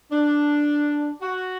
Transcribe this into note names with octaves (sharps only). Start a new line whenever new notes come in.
D4
F#4